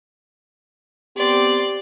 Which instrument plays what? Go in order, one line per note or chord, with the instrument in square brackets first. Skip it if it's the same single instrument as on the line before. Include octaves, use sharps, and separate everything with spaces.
[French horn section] B3 C4 G4 [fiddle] D5 C6